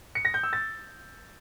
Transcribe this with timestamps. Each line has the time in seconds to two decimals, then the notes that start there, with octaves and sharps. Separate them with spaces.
0.15 C#7
0.25 A#6
0.34 G6
0.43 E6
0.53 A6